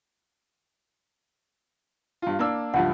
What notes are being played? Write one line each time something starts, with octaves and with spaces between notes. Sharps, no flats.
G2 F4
A#3 D4 E6
C#2 G2 F3 F#5